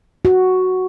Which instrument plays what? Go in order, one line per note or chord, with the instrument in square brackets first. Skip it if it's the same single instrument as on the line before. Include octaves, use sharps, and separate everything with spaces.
[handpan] F#4